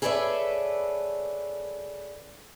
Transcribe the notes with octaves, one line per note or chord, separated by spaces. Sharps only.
G#4 A4 B4 C#5 D5 E5